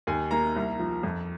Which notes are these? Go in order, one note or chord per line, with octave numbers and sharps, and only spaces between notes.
D#2 G#5
A#3 A#5
C2
F3
F2